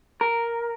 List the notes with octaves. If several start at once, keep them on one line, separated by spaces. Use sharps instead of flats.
A#4